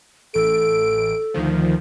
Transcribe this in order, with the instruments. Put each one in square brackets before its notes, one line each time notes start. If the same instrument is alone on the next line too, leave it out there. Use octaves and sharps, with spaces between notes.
[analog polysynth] A1 D7 [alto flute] A4
[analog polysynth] D2 D#3 F3